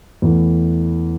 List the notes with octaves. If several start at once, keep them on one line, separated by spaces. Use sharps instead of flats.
E2 E3 A3